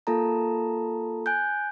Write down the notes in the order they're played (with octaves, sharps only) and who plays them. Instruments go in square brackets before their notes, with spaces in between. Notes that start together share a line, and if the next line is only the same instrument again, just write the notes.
[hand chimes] A#3 F4 A4 A5 A#5
G#5 F#6 G6